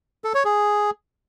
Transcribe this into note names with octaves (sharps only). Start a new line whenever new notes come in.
A4
C#5
G#4